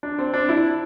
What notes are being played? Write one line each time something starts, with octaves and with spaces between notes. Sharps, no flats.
D4
C4
D4
E4